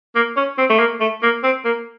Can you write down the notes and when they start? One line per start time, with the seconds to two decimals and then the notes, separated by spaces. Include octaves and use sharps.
0.15 A#3
0.37 C#4
0.58 C4
0.70 A3
0.79 A#3
1.00 A3
1.23 A#3
1.44 C4
1.65 A#3